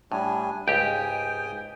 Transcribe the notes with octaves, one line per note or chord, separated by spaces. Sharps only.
A2 G3 D4 G#5
C#2 G#2 G4 G5 G#5 D#6